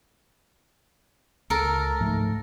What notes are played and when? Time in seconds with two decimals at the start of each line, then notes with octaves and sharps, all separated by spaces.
1.50 C#2 A4 A#4
2.00 G#2 F3 A3